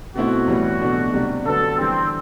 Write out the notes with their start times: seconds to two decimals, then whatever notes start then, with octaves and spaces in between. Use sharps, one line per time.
0.15 B2 A3 C4 E4 F#4
0.48 A2 E3 G3
0.81 B2 F#3 A3 D4
1.13 C3 G3 D4
1.45 D3 F#3 B3 A4
1.78 E3 G3 C4 D4